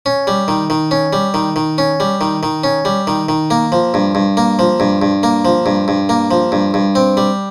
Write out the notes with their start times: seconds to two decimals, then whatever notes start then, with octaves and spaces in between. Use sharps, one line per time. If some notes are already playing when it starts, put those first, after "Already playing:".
0.06 C#4
0.27 G3
0.48 D#3
0.70 D#3
0.91 C#4
1.13 G3
1.34 D#3
1.56 D#3
1.78 C#4
2.00 G3
2.21 D#3
2.43 D#3
2.64 C#4
2.85 G3
3.07 D#3
3.29 D#3
3.51 A#3
3.72 F3
3.94 G2
4.15 G2
4.37 A#3
4.59 F3
4.80 G2
5.02 G2
5.23 A#3
5.45 F3
5.66 G2
5.88 G2
6.09 A#3
6.31 F3
6.52 G2
6.74 G2
6.95 C4
7.17 G3